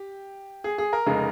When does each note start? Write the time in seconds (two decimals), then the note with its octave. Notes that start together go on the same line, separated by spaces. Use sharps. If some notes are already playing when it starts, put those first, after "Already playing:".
Already playing: G4
0.64 G#4
0.78 G#4
0.93 A#4
1.06 F1 C#3 G#3 D#4